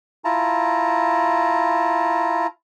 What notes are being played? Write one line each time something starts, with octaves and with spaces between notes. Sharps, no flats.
E4 F4 A5 A#5